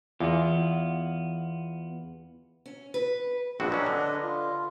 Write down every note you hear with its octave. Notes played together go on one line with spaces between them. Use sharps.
E2 B3 F4
C#4
B4
A#1 C4 D4 F#4 B4 D#5
F#3 C#4
D3
F4